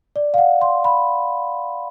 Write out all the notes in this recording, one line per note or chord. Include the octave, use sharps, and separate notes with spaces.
D5
F5
F#5
C6
B5